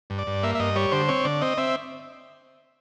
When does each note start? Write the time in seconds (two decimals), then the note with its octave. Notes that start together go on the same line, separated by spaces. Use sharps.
0.10 G2
0.18 D5
0.27 G2
0.43 A#3 E5
0.55 E5
0.60 G2 D#5
0.76 G3 C#5
0.92 D3 C5
1.08 C4 C#5
1.25 D3 D5
1.41 C4 D#5
1.58 C4 E5